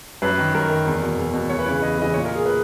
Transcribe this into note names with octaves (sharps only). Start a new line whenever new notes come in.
F#2 B4
D#3
F#2 A#4
D#3
E2
B2
E2
B2
E2 C#5
B4
C#3 E3 C#5
E2 D#5
C#3 E3 D#5
A#2 C#5
A#4
G#4
A#2 B4